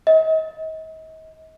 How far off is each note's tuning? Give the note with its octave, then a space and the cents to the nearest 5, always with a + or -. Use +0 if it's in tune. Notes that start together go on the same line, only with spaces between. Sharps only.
D#5 +40